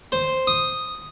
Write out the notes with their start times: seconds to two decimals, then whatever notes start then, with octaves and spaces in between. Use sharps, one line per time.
0.12 C5
0.47 D#6